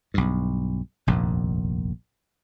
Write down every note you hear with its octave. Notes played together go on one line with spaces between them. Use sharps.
B1 G2
F1 A#1 D#2 A#2